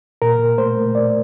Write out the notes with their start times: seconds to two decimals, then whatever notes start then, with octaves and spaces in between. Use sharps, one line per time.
0.22 A#2 A#4
0.39 A#2
0.58 A3 C5
0.77 A3
0.95 A#2 D5